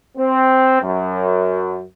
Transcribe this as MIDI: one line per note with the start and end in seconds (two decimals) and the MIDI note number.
0.18 0.79 60
0.82 1.82 42